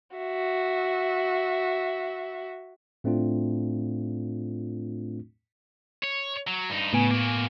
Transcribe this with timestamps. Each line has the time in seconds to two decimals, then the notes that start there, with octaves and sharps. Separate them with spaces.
0.17 F#4 E5
3.04 A2 A3 C4 D4 F4
6.03 C#5
6.47 F#3
6.70 G2 D#4
6.93 A2 C#3 B3 G#5
7.11 A#3 F#4